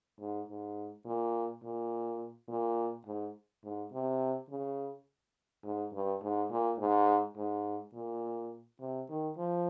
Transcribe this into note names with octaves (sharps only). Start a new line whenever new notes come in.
G#2
G#2
A#2
A#2
A#2
G#2
G#2
C3
C#3
G#2
G2
G#2
A#2
G#2
G#2
A#2
C3
D#3
F3